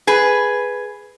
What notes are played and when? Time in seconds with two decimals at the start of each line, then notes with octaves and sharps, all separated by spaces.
0.07 G#4 B4